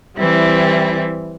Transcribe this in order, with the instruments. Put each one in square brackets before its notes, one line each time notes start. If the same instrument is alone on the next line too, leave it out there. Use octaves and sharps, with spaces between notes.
[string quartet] E3 G3 C4 E4